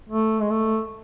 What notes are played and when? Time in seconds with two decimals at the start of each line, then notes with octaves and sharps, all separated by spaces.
0.09 A3
0.41 G#3
0.51 A3